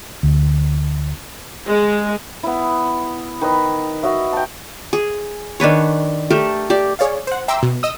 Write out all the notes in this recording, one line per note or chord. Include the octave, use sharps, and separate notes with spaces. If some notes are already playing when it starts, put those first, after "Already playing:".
D2
G#3
B3 E4
D#3 B4 D#5
F#4 D#5 E5
G5 A5
G#4
D#3 D4 B4 C#5
A3 G4 A4 A#4
G4 D5
G#4 C#5 D5 F5
C5 F#5
E5 G5 A#5 C6 D6 E6
B2
D#5 D#6 E6